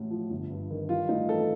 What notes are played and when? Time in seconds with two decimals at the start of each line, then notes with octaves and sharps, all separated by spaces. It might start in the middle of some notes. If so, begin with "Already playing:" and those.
Already playing: A1 A2 F#3
0.11 F3
0.30 G1
0.50 G2
0.71 D#3
0.89 G3 F4
1.09 A2 D#4
1.28 E3 A4